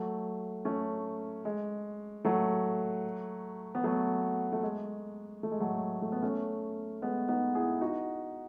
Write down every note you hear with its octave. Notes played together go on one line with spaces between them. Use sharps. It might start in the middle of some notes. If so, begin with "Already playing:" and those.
Already playing: F#3 A3
A3 C#4
G#3
F#3 A3
B3
F#3 A3
A3
G#3
A3
G#3
F#3 A3
A3
B3
A3 C#4
G#3 B3
B3 D#4
E4 G#4
D#4 F#4